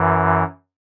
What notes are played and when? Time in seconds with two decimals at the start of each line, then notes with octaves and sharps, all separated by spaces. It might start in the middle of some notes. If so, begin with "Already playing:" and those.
Already playing: F#2 E3